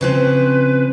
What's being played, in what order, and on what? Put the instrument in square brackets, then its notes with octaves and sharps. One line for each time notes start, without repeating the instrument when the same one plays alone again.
[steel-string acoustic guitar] C#3 F3 C4 [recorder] B4